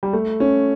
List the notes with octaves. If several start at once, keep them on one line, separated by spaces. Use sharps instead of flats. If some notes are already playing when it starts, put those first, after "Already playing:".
G3
A3
C#4